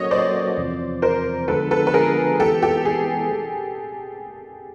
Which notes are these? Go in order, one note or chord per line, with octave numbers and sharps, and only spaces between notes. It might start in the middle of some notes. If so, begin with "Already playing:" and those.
Already playing: F#3 A#3 C#4 F#4 A4 C#5 D#5
C5 D5
E2 C3 F3
A#4 C5
D3 F3 G#3 B3 A4 B4
A4 B4
B4
G#4 A#4
E3 G#3 B3 G4 A4
G4 A4
G#4